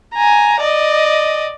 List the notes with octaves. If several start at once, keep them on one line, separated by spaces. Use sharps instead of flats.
G#5 A#5
D5 D#5